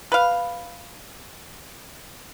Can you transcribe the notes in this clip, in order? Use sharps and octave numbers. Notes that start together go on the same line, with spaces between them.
B4 F5